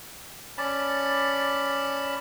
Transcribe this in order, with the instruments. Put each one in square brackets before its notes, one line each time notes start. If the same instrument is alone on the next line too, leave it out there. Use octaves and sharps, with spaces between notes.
[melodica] C#4 D5 A5 B5